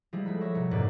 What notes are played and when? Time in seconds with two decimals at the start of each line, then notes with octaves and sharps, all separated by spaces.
0.13 F3 G3 G#3 E4
0.26 A3 F#5 B5
0.41 C#5 E5 C#6 A#6
0.55 A#1 B2 C#7
0.71 F1 F2 G#2 A#3 B4 D5